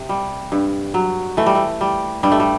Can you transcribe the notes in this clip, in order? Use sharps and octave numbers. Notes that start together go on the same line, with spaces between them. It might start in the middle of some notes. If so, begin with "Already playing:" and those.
Already playing: C3
G3
G2
F#3
E3 A3
G3
A3
G3
G2 G3
A3
G3